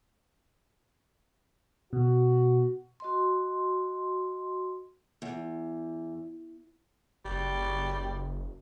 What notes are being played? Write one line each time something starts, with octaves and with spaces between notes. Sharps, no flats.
B2 F#4
F#4 D#5 C6
E2
F#1 G3